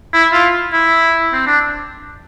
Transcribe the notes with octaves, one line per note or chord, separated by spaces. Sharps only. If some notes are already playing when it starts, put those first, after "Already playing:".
E4
F4
E4
C4
D4